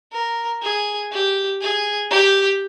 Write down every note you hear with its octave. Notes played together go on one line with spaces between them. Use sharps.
A#4
G#4
G4
G#4
G4